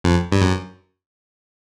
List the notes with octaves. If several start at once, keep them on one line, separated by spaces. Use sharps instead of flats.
F2
G2
F#2